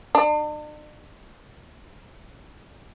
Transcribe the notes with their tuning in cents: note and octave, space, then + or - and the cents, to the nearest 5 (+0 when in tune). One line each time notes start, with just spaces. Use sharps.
D4 +45